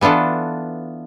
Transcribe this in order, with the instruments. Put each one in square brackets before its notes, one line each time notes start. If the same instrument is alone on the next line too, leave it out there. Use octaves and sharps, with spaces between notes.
[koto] E3 B3 D4 F4 A4